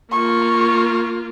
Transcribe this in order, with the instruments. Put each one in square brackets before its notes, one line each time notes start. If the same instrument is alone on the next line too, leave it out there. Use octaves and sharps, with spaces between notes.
[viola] A#3 F4 [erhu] C#6